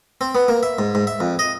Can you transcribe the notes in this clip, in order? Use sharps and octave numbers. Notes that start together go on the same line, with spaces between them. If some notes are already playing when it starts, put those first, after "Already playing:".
C4
B3
A#3
E5
G#2
G#2
E5
F2
D#5